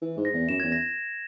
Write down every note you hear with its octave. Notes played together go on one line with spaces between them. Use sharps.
E3
G#2
A#6
E2
F#2 E7
G#6
E2
A#6